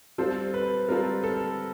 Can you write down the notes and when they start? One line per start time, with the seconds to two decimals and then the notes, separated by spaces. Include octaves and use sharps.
0.18 G3 C4 F4 A4 C5
0.54 B4
0.88 G3 C4 F4 A4 A#4
1.24 A4